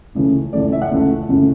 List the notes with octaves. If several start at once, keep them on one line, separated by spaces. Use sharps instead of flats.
C#2 C#3 E3 A3
C#2 C#3 E3 A3 D5
E5
F#5
C#2 C#3 E3 A3
C#2 C#3 E3 A3